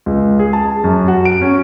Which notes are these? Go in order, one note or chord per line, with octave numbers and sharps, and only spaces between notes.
C#2
G#4
A5
F#2
F#4
D7
C#4